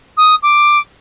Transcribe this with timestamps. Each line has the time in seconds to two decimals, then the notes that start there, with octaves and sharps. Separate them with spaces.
0.17 D#6
0.42 D6